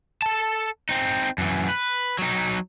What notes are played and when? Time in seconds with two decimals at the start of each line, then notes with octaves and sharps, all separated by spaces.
0.22 A4 A5
0.89 C4 D#4
1.38 F#2 E3
1.69 B4
2.19 F#3 D#4